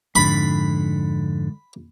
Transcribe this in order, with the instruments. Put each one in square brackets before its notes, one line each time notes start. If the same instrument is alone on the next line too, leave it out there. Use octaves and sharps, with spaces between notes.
[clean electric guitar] F2 G#2 D3 [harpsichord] B5